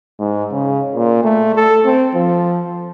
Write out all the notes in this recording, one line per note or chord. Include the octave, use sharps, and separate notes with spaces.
G#2
C#3
A#2
A3
A4
C4
F3